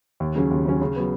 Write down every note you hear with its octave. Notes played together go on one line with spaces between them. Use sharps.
D#2
C#3 F#3 C#4
D#2
C#3 F#3 C#4
C#3
F#3 B3